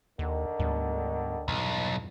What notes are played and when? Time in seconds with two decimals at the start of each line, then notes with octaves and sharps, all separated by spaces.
0.19 D#2 D3 D#3
0.59 D2 G#2 G3 B3
1.48 B1 E2 G2 E3